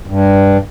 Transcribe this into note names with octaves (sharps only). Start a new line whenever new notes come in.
G2